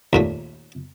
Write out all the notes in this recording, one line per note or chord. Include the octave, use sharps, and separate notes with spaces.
D#2 A#2 A3